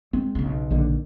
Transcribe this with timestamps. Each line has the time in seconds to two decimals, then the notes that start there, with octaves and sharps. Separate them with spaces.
0.13 G#2 C4
0.35 B1 C#3
0.70 A#1 D3 D#3